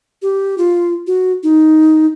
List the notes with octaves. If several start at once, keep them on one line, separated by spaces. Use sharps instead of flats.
G4
F4
F#4
D#4